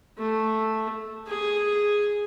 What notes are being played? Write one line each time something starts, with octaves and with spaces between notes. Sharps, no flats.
A3
G#4